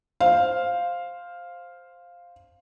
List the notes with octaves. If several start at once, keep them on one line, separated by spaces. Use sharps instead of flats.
C5 F5